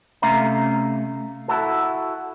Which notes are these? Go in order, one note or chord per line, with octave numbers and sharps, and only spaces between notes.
C3 A3 C#4 E5 F5 A#5
E4 F#4 A4